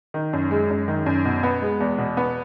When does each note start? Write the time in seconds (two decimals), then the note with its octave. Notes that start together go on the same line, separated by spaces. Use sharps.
0.14 D#3
0.33 F#2
0.51 G#3
0.70 F#2
0.88 D#3
1.06 F#2
1.25 B2
1.43 B3
1.62 G#3
1.80 E2
1.98 B2
2.17 B3